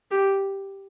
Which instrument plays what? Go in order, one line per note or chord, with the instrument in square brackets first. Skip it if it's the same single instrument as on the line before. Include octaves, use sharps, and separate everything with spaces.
[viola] G4